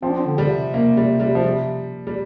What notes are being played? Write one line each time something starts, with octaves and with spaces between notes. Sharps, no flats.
F3 C4
D4
C4
D3
G3
C3
A#3
G3
G3
F3
G3
G3